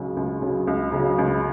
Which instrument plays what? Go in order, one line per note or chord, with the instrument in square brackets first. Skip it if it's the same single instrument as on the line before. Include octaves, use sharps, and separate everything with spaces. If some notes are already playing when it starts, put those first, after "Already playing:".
Already playing: [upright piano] C#2 C#3 F#3
C#2
C#3 F#3
C#2
C#3 F#3
C#2